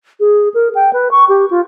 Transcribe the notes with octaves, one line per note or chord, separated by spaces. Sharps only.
G#4
A#4
G5
B4
C#6
G4
F4